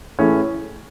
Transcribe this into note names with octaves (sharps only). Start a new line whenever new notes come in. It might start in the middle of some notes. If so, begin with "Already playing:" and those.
A2 E3 A3 C#4 G#4